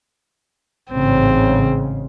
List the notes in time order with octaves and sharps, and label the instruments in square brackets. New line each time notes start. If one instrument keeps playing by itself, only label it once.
[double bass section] A1 G#2 C#3 [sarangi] C4